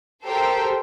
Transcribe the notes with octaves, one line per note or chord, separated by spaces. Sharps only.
G4 A4 A#4 C5 G5